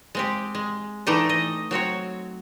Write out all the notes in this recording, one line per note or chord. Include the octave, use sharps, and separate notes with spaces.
G#3 C4 G4
G#3
E3 A3 D4 D#4 G4 D#5
D#5
F#3 C4 F#4 C#5